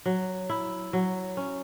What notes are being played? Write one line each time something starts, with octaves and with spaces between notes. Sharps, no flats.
F#3
E4
F#3
C#4